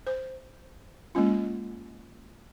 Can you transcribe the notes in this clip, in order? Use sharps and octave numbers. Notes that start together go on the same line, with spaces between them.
C5
G#3 A#3 C#4 F4